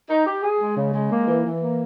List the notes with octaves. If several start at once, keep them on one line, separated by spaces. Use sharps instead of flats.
D#4
G4
G#4
G#3
C#3
G#3
A#3
E3
E3
A#3